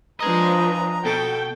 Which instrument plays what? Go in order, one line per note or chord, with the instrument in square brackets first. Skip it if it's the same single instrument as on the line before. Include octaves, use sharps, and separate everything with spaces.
[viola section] F3 D4 B4 [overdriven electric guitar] D#5 G#5 [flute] A#5
[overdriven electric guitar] B2 [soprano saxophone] A4 [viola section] G5